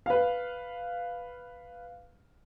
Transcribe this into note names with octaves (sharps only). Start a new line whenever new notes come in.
B4 F5